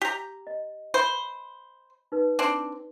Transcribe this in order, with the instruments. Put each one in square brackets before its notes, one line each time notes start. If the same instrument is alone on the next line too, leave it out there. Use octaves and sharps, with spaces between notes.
[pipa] G4 A#5
[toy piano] D#5
[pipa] C5 [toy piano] B5
[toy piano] D#4 B4
[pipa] C4 D4